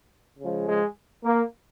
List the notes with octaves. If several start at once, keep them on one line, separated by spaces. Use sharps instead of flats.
C#3 F3 G#3
G#3
A#3